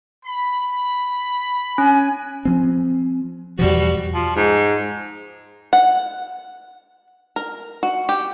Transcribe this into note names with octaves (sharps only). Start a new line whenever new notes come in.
B5
C#4 G#5
F3 C4
E2 B2 F3 G3 F#4
F3
G#2
F#5
A#4
F#4
G4